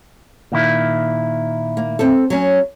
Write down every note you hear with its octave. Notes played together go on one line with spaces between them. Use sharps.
A#2 D#3 E4
A#3
C4 A4
F#3 C#4